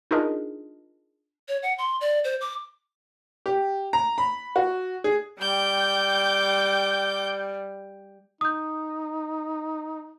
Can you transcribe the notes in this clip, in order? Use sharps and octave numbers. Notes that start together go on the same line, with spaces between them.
D4 D#4 F4 G#4 A#4 D#5
C#5
F#5
C6
D5
C5
D6
G4
A#5
B5
F#4
G#4
G3 G5 D6 G6
D#4 D#6 G6